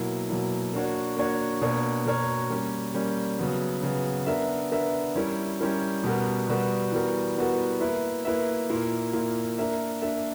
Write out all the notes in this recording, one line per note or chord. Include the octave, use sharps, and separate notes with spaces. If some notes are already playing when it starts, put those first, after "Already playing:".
Already playing: B2 F#3 A#3 E4
B2 F#3 A#3 E4
A#3 D4 F#4 C#5
A#3 D4 F#4 C#5
B2 A#3 D4 A#4 C#5
B2 A#3 D4 A#4 C#5
G3 A#3 C#4
G3 A#3 C#4
C#3 F#3 B3
C#3 F#3 B3
B3 D4 A#4 E5
B3 D4 A#4 E5
G3 C#4 E4 A#4
G3 C#4 E4 A#4
B2 G3 B3 F#4 A#4
B2 G3 B3 F#4 A#4
E3 G3 B3 F#4 A#4
E3 G3 B3 F#4 A#4
A#3 E4 B4 E5
A#3 E4 B4 E5
A#2 A#3 E4
A#2 A#3 E4
A#3 D4 A#4 E5
A#3 D4 A#4 E5